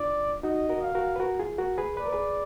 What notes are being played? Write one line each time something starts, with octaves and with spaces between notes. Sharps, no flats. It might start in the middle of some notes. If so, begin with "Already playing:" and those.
Already playing: D4 F4 D5
D#4 F#4 D#5
F#4 A#4
F5
F#4 A#4
B4
F#4 A#4
F4 G#4
F#4 A#4
G#4 B4
B4 D5
A#4
G#4 B4